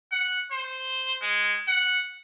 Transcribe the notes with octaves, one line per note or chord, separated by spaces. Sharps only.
F#5
C5
G#3
F#5